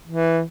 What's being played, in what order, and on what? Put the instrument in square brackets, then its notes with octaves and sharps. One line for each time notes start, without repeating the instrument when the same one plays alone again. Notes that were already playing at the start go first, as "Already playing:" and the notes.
[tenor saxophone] E3